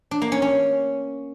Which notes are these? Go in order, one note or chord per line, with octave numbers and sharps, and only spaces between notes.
D4
A#3
C#4
C#4